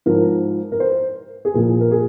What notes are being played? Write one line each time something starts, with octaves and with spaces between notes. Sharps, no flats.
G#2 F3 A#4
A#4
C5
G#4
A#2 F3 A#4
A#4
G#4